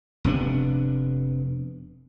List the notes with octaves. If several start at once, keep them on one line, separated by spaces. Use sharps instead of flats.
F1 C3 B3 D4